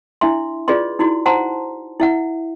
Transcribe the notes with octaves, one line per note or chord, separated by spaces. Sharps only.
D4 E4 E5 C6
F4 G#4 B4 D5 D#5 C6
D#4 E4 F#4 C6
C5 F#5 A5 A#5 C6
E4 E5 F#5